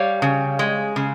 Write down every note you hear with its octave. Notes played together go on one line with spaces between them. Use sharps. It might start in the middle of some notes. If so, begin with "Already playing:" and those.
Already playing: G3 C#5 F5
C#3
G#3
C#3